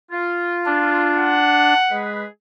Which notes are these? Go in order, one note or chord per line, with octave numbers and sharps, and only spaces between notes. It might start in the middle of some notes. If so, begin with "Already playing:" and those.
F4
D4
F#5
G#3 G#4 B4